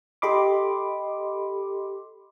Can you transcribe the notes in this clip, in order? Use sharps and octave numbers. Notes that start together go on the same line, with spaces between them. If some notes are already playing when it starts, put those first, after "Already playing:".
G4 A4 D#5 B5 C6 D6